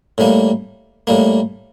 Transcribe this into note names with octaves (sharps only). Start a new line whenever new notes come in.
A2 G3 A#3
A2 G3 A#3